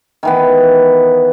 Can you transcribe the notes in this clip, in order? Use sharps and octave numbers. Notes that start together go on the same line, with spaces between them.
D#3 E3 B3